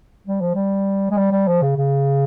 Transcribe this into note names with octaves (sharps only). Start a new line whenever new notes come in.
G3
F3
G3
G#3
G3
G3
F3
C#3
C#3